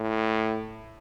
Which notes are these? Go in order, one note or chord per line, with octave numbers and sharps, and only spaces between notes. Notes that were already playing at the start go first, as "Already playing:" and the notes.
Already playing: A2